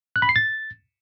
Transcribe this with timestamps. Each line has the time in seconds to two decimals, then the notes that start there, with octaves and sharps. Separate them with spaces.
0.16 F#6
0.22 B5
0.29 C7
0.36 A6